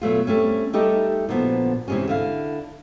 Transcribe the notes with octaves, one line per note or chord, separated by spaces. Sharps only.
B2 F#3 A3 F4
G3 A3 C4 C#4
G3 A3 D#4 G4 A4 D#5
A#2 D3 F3 B3 F#4
C3 E3 G#3 C4 C#4
D3 E4 F5